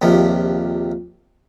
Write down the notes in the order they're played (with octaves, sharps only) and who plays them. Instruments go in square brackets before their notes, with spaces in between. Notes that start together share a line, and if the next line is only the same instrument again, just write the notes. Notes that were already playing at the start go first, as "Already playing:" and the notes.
[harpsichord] A#1 D#2 C3 F3